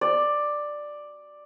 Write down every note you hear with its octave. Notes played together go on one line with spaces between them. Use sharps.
D5